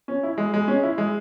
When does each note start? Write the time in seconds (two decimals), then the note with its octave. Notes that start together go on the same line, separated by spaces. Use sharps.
0.08 C#4
0.23 E4
0.38 G#3
0.54 G#3
0.68 C#4
0.83 E4
0.98 G#3